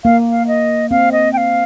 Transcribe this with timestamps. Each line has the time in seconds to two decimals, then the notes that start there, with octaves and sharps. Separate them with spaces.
0.04 A#3 F5
0.30 F5
0.47 D#5
0.90 C4 F5
1.12 D#5
1.33 G5
1.37 F5